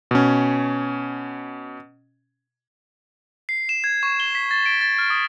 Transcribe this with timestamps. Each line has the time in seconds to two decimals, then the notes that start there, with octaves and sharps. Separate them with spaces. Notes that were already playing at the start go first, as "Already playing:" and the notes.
0.11 B2 C#4
3.49 C7
3.69 E7
3.84 G#6
4.03 C#6
4.20 G7
4.35 B6
4.51 A6
4.66 D7
4.81 A6
4.99 F6
5.10 D#6